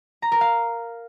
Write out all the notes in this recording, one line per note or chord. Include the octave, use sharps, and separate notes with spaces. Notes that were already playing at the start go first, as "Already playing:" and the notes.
A#5
A#4
F5